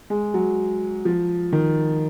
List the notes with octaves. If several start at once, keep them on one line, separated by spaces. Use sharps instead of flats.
G#3
F#3
F3
D#3